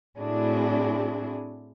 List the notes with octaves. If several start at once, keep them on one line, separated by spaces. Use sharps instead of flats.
A2 C4 D4 E4 F#4 G#4